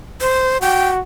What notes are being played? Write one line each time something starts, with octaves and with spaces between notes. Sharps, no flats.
C5
F#4 G5